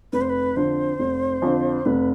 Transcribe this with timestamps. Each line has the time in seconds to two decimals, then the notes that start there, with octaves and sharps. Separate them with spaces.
0.13 F1 B4
0.21 C5
0.30 B4
0.56 F2 D3 C5
0.99 F1
1.42 F2 D3
1.85 F1 B4